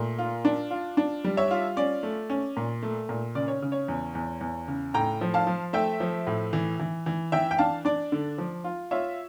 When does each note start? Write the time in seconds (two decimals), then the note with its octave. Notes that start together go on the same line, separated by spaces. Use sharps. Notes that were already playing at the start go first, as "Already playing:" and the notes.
Already playing: A#2 A3
0.19 F4
0.45 D4
0.71 F4
0.97 D4
1.24 G3
1.37 C#5 E5
1.51 F4
1.77 C#4 D5
2.03 A3
2.30 C#4
2.57 A#2
2.83 A3
3.09 A#2
3.35 C#3 D5
3.48 C#5
3.62 C#3
3.72 C#5
3.88 E2
4.15 E2
4.41 E2
4.68 C#3
4.94 A2 G5 A#5
5.21 F3
5.34 F5 A5
5.47 F3
5.73 A3 E5 G5
6.00 F3
6.27 A2
6.53 E3
6.79 E3
7.06 E3
7.32 E3 E5 G5
7.51 G5
7.58 D4 F5 A5
7.85 D4 D5
8.12 D3
8.38 F3
8.64 F4
8.91 F4 C#5 E5